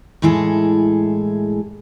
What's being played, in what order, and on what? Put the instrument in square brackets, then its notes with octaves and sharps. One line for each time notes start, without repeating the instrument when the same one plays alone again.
[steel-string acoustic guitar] A2 E3 G#3 G#4 A4